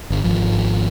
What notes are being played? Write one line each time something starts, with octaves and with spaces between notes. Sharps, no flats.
G1
G#1 F3